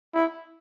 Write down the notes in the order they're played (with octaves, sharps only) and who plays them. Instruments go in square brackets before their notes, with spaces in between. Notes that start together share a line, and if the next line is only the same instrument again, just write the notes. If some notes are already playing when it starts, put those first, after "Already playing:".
[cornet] E4